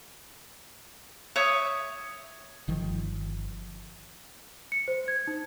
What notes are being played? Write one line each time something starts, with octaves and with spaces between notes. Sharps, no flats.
C#5 E5 D#6
G1 D#3 F3
C#7
C5
G#6
D#4